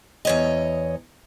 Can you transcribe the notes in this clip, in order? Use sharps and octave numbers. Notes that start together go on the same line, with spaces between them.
E2 C#5 D#5